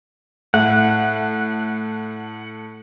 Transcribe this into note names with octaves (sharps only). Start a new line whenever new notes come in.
A2 F#5